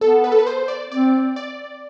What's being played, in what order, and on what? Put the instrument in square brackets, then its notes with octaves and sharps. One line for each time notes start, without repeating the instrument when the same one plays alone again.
[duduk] B3 [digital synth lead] A4
[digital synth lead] B4
A4
B4
C5
D5
[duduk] C4 [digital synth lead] D5
[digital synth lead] D5